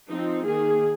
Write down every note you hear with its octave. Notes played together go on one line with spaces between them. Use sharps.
F3 C4 D#4
D#3 A#3 G#4